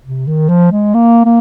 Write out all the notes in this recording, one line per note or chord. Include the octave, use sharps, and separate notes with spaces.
C3
D#3
F3
G#3
A#3
A#3